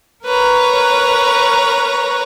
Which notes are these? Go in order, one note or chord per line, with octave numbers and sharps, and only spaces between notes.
A#4 B4 C#5 A#5